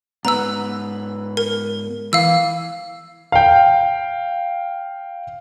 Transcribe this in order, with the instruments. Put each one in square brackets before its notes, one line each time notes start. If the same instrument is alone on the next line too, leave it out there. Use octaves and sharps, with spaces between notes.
[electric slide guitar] G#2 B3 B4 [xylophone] A#5 E6
[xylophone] A#4
[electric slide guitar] E3 [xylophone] F5 E6
[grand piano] F5 G5